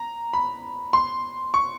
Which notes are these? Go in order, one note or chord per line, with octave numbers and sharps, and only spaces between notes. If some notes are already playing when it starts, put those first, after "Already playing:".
Already playing: A#5
B5
C6
C#6